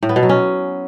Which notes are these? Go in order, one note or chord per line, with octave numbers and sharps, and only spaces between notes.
A2
B3
B2
F#3
C#4